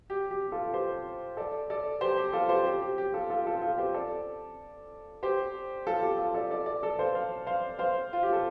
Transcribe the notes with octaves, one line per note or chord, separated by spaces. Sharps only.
G4
G4
F4 A4
G4 C5
A4 D5
A4 D5
G4 C5
G4
F4 A4
G4 C5
G4
G4
G4
F4 A4
F4 A4
F4 A4
F4 A4
G4 C5
A4 D5
G4 C5
F4 A4
G4
F4 A4
A4 D5
A4 D5
A4 D5
A4 D5
C5 F5
C5 F5
C5 F5
C5 F5
F4
G4
A4